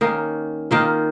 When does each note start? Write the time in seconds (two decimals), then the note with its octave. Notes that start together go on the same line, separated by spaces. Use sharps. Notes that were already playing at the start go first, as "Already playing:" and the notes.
0.01 D#3 A#3 C#4
0.71 D#3 A#3 F4